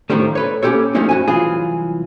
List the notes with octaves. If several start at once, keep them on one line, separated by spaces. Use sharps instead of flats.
A2 D#3 F3 G3 A3
A4 B4 C#5
A#3 C#4 F4 G4 A4 C#5
F3 G3 A3 A#3 C#4 D#4
G2 F#4 G#5
C2 E3 F#3 F4 G#4